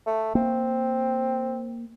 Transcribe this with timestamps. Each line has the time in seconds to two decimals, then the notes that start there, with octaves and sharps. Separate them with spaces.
0.06 A3
0.35 A#3 C4